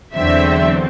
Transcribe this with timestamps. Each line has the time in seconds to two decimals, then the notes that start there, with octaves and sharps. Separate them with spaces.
0.15 E2 D3 F#3 C4 E5